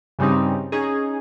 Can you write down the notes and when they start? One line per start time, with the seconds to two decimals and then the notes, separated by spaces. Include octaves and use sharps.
0.19 G2 C#3 G3 C4 D#4
0.72 C#4 D#4 G#4